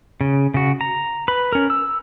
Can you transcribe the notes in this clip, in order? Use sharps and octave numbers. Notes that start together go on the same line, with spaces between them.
C#3
C#3 F#4
A#5
B4 B5
C#4 A#4
E6